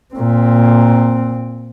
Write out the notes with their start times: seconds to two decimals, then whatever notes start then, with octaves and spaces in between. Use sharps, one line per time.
0.15 A#2 C4